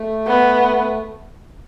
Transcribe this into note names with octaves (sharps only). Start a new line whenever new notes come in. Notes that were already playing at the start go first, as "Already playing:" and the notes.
Already playing: A3
B3